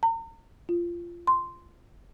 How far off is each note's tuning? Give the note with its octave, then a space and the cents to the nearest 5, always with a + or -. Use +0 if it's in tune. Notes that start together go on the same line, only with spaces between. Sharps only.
A#5 -40
F4 -15
C6 -5